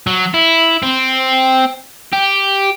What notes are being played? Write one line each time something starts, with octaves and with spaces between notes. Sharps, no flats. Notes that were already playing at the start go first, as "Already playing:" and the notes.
F#3
E4
C4
G4